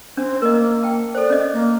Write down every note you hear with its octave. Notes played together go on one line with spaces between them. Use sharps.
C#4 D4 C5
A#3 A#4 D#5
G5 A5
A4 C5 D5
C#4 D#5
A#3